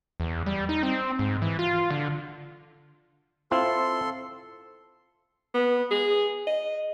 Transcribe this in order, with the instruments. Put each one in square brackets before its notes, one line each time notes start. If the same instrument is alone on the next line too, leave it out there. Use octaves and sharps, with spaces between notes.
[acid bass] E2
G3
D#4
C4
G#2
E3
F4
D3
[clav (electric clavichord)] C4 E4 F4 [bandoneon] A4 C6
[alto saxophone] B3
G#4
D#5